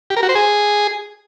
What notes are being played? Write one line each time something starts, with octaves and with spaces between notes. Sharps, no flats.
G4
A#4
F#4
C5
G#4